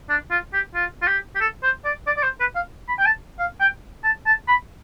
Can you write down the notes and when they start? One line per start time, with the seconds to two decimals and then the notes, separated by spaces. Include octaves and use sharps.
0.09 D4
0.31 F4
0.53 G4
0.74 F4
1.02 F4
1.07 G4
1.36 G4
1.40 A4
1.63 C5
1.85 D5
2.07 D5
2.17 D5
2.23 C5
2.40 B4
2.55 F5
2.88 B5
2.99 G5
3.06 A5
3.39 F5
3.60 G5
4.04 A5
4.26 A5
4.48 B5